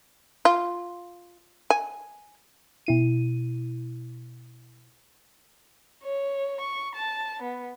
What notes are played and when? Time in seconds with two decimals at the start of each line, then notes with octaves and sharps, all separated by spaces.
0.45 F4
1.70 G#5
2.87 B2 E4 D#7
6.03 C#5
6.61 C#6
6.95 A5
7.42 B3